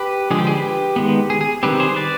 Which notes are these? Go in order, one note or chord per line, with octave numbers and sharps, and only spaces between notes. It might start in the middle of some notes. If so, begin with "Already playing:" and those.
Already playing: G4 B4
D3 F3 G#3 G#4
G4
G#4
G4 B4
D#3 G#3 B3
G#4
G#4
D#3 G3 C4 G4 B4
G#4 C5
B4 D5